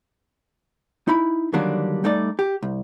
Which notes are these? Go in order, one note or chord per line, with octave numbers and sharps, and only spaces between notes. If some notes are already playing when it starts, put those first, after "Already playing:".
D#4 E4 B5
D3 D#3 F#3 G3 A#3 D4
G3 A3 D#4 D5
G4
C2